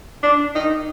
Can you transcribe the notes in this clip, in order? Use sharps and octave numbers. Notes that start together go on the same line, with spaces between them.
D4
D#4